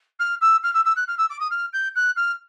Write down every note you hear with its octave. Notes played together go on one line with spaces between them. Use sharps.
F6
E6
F6
E6
E6
F#6
F6
E6
D6
D#6
F6
G6
F#6
F6